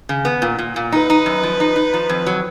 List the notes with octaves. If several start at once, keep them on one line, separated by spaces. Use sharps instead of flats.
C#3
B3
A#2
A#2
A#2
D#4 B4
D#4
F#2
F3
D#4
D#4
F3
F2
F#3